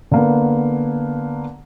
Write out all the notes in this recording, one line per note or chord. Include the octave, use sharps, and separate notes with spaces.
D3 A#3 B3